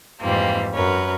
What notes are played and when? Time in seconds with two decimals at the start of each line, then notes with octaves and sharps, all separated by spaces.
0.22 F2 G#2 E3 G3 A#3 C4
0.74 F#2 A#4 B4 C#5